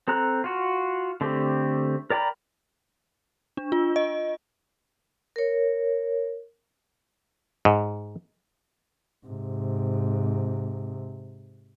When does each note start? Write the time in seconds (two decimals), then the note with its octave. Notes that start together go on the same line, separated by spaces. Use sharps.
0.08 C4 A4 A#5 F#6
0.44 F4 F#4
1.21 D3 A3 C4 G4
2.10 A#4 D5 G5 A#5 B5
3.57 D4
3.72 F4
3.96 D#5
5.36 A#4 C#5
7.65 G#2
9.26 G#2 C3